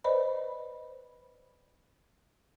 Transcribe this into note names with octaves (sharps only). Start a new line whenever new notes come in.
B4 C5 D5 D#5 B5